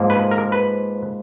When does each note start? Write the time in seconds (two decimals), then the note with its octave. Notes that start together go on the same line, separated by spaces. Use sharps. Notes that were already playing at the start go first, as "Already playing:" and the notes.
Already playing: G#2 F3 A#3
0.10 B4
0.31 A#4
0.52 B4